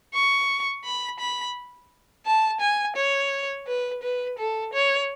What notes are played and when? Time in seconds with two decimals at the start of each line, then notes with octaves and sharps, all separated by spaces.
0.14 C#6
0.84 B5
1.20 B5
2.26 A5
2.61 G#5
2.97 C#5
3.67 B4
4.03 B4
4.39 A4
4.74 C#5